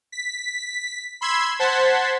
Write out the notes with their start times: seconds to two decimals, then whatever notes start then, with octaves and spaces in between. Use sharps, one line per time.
0.12 B6
1.21 B5 C6 E6 G#6
1.59 C5 F#5 A5 C6 G#6 B6